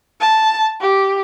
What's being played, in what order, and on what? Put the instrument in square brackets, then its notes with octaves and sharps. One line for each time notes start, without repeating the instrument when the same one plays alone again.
[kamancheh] A5
G4